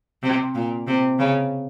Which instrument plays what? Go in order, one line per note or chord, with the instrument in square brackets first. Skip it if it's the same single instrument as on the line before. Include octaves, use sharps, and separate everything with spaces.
[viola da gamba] C3
A#2
C3
C#3